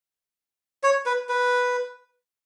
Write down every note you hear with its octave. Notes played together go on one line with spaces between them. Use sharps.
C#5
B4
B4